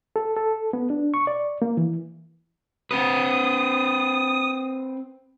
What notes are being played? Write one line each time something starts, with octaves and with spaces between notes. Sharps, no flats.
A4
A4
B3
D4
C#6
D5
A#3
E3
C4 B4 D#6